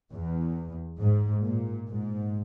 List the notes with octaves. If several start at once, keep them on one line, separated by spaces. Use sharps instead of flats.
E2
G#2
A#2
G#2